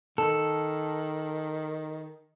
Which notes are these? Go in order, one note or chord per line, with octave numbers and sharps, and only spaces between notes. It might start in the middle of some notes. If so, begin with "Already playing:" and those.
D#3 A4